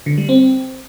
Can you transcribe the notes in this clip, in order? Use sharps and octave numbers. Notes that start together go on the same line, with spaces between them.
D3
G3
C4